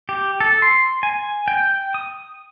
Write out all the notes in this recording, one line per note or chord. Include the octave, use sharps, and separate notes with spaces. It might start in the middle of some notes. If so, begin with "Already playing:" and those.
G4
A4
C6
G#5
G5
D#6